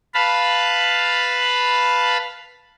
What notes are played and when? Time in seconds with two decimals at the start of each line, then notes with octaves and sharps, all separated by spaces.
0.14 B4 F5 A5 B5